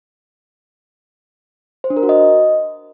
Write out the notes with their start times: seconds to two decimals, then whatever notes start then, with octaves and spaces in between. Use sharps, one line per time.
1.84 C5
1.90 D4
1.97 A#4
2.03 F#4
2.09 D#5